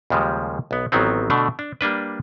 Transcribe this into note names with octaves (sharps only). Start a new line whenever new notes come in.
D#2 C#3 F3 G3 G#3
B1 B3
A1 D#3 F#3 B3 C4
B2 D3 A3 D4
D4
G3 A#3 D4 B4